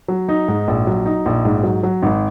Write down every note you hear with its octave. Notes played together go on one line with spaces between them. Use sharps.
F#3
D#4
G#2
A#1
F#3
D#4
A#1
G#2
F#3
F#3
G#1